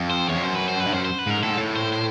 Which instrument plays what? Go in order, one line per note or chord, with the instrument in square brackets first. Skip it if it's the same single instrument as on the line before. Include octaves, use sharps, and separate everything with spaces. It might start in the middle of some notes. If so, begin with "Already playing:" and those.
Already playing: [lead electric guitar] F2
[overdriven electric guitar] C5
[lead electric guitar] E2 [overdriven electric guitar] C#5
[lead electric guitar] F2
[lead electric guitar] F#2 [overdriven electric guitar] C5
[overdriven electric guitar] B4
C5
B4
[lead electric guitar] G2
[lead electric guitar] F#2 [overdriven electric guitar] C5
[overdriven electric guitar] C5
B4
[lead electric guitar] G#2 [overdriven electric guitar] A#4
[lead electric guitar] A2 [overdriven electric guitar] A4
[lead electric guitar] G#2
A2
[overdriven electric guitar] C5
C5